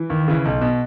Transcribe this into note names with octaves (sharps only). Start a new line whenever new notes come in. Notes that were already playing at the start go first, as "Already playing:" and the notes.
Already playing: E3
D#2
C#3 E3
B1
B2